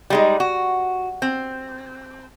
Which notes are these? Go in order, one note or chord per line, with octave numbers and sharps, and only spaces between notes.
G3 G#3 D#4
F#4
C4